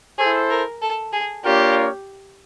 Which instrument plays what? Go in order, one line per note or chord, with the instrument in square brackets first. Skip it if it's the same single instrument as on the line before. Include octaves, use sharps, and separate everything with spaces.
[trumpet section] E4 A4 C5 [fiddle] G#4
[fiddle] A#4
A4
G#4
[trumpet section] A#3 D4 F4 A#4 C#5 [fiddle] G4